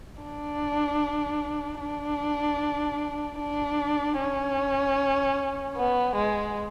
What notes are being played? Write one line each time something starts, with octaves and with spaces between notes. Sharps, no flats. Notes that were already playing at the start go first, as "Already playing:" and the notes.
D4
D4
D4
C#4
B3
G#3